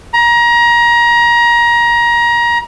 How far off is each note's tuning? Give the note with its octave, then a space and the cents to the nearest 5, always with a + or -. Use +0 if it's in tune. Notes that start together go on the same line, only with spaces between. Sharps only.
A#5 +25